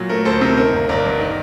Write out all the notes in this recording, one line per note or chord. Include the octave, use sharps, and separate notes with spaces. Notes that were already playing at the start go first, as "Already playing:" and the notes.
Already playing: A#2 F#3
A3 A#4
D2 A4 C5
C3 A#4
D#3 A#4
G1
G1 A#4 D5
G2
D#3